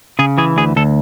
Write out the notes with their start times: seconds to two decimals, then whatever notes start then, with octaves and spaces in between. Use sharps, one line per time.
0.19 C#3 G#4
0.38 E3 G#4
0.57 D2 G#4
0.76 D2 A4